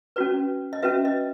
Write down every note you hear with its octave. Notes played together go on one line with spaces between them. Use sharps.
C#4 F#4 B4 D5
D#5
C#4 F#4 B4 E5
D#5